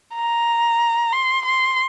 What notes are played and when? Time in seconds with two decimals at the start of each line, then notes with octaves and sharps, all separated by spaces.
0.15 A#5
1.12 C6
1.45 C6